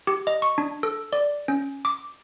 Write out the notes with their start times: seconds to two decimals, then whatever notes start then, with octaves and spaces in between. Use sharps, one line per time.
0.07 G4
0.27 D#5
0.42 C#6
0.58 D4
0.83 A4
1.13 D5
1.48 C#4
1.85 D6